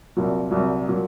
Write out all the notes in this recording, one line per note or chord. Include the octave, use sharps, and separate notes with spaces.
C2 A#2 F#3
C2 A#2 F#3
A#2 F#3